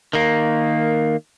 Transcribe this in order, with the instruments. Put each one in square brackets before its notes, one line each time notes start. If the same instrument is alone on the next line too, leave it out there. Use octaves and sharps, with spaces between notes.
[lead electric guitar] D#3 A#3